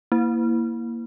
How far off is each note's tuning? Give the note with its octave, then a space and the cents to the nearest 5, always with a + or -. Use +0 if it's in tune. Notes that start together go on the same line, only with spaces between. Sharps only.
A#3 +0 E4 +0